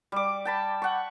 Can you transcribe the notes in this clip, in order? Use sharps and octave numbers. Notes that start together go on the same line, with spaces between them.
G3 D6
G5 A5 B5
F#5 C#6